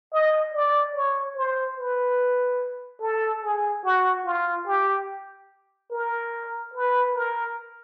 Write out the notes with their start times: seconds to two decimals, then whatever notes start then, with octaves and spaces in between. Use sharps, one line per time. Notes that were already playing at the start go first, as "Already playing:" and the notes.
0.13 D#5
0.54 D5
0.96 C#5
1.37 C5
1.78 B4
3.02 A4
3.43 G#4
3.85 F#4
4.26 F4
4.67 G4
5.91 A#4
6.74 B4
7.15 A#4